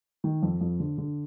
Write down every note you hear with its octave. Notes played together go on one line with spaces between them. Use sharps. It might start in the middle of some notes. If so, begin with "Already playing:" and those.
D#3
F2
F2
D3
D3